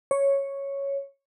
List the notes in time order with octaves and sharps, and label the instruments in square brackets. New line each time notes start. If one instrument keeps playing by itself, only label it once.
[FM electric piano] C#5